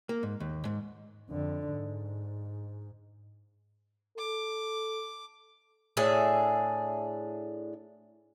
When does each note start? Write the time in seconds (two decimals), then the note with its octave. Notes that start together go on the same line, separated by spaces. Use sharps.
0.09 A#3
0.23 G#2
0.40 D#2
0.65 G#2
1.31 F2 D3
1.70 G#2
4.18 A4 D6
5.97 A2 D4 G#4 E5